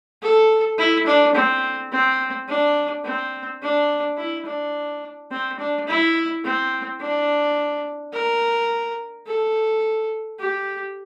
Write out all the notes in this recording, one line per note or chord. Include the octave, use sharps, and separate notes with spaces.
A4
E4
D4
C4
C4
D4
C4
D4
E4
D4
C4
D4
E4
C4
D4
A#4
A4
G4